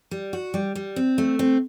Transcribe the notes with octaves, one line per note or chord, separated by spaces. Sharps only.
G3
F#4
G3
G3
C4
A3
C4